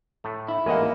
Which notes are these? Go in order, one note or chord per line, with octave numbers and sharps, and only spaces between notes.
A2 A3
E4
A1 G#2 A#3 A#4 D#5 F#5 G#5